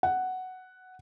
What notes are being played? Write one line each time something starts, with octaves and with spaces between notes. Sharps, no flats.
F#5